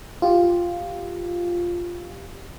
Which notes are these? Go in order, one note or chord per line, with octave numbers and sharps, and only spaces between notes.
F4 G4